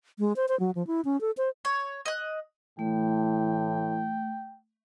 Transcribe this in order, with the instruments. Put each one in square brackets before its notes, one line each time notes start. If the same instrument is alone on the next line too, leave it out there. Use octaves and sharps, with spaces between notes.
[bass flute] G#3
C5
C5
F#3
F3
E4
C#4
A4
C5
[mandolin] C#5
D#5 F#6
[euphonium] A2 [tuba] E3 [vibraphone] A3 [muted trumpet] G5